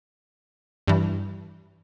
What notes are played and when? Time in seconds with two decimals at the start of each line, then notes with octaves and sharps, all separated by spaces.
0.88 G2 E3